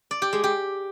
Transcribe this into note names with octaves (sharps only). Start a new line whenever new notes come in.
D5
G4
G#3
G4